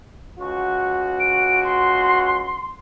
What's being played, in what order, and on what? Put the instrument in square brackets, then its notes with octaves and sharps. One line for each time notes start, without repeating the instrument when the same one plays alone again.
[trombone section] C#2 F#4 [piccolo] C#6
[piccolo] D7
C6